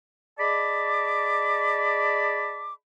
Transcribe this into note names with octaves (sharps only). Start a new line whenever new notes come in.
G#4 D5 D#5 A5 B5 D6